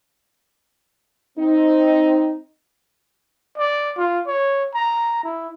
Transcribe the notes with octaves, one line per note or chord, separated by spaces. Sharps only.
C4 D#4
D5
F4
C#5
A#5
E4